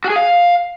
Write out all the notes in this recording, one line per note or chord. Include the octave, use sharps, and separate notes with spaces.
F#4
G#4
F5